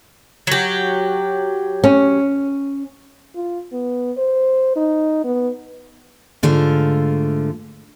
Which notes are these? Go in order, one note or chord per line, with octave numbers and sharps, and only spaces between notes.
F#3 G4
C#4
F4
B3
C5
D#4
B3
G#2 D3 A3 F4